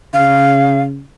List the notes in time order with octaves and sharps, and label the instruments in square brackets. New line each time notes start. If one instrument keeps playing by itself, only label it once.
[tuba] C#3 [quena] F5